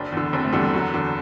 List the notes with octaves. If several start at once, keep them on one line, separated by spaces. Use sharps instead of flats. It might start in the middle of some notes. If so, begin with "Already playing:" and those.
Already playing: F#1 D4
E2 D3
F#1 C4
A3
E2 D3 G3
G3
F#1 F#3
E2 D3